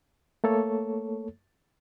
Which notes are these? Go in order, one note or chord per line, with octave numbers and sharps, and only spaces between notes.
A3 A#3 A4 C#5